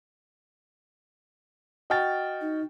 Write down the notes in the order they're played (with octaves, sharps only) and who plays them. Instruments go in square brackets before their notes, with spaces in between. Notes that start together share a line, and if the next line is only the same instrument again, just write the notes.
[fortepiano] F#4 G5 [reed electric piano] D#5 F6 A6
[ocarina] D#4